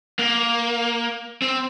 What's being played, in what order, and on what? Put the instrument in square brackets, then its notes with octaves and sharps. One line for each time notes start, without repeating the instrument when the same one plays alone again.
[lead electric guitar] A#3
C4